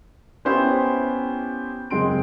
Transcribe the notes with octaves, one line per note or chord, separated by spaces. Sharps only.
B3 C#4 E4 G4 C5 B5
F#1 G#3 C4 C6 D7